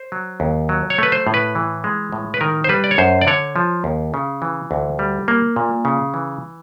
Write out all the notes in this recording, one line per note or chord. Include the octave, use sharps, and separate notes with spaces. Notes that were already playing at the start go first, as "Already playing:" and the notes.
Already playing: C5
F#3
D#2
F#3
C#5
A3 B4
C5
A2
B4
E3
G#3
A2
B4
D#3 A#4
C5
G3 B4
D5
C#5
F#2 C5
D5
D3 C#5
F3
D#2
C#3
E3
D2
G3
A#3
A#2
C#3
E3